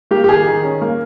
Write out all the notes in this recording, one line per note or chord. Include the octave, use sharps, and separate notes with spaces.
A#3 G4
G4
D#3 G#4
D#3
C#4
A#3